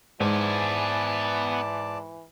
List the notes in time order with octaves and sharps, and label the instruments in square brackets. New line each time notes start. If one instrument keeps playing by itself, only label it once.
[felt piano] G#2 [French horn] E3 [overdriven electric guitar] B3 G#5 [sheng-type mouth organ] D5 A5